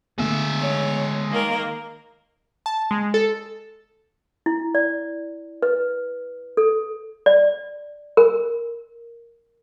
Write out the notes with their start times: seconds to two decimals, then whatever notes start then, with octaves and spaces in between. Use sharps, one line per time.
0.18 D3 G#3 A3 B3 E5
0.59 C#5
1.30 D#3 A#3 A#4
2.66 A5
2.91 G#3
3.14 A4
4.46 E4
4.75 D5
5.62 B4
6.57 A4
7.26 D5
8.17 A#4